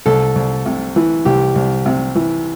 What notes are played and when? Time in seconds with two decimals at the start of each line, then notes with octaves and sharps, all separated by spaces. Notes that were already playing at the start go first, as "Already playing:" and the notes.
0.06 C2 A4
0.36 C2
0.66 C3
0.96 E3
1.25 C2 G4
1.55 C2
1.86 C3
2.15 E3